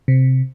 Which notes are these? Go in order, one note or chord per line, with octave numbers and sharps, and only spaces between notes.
C3